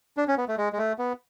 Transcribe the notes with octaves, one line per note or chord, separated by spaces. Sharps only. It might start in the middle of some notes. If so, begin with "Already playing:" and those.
D4
C#4
B3
A3
G#3
G#3
A3
B3